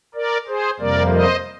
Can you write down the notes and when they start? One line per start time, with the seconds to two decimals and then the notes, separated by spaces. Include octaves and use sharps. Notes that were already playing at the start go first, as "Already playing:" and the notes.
0.14 A#4 D5
0.47 G#4 C5
0.80 F2 C3 G3 A#3 A#4 D5
1.13 C5 D#5